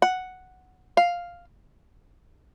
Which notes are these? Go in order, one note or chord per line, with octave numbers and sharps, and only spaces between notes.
F#5
F5